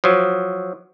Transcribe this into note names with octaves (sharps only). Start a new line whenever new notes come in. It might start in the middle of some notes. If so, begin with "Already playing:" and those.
F3 F#3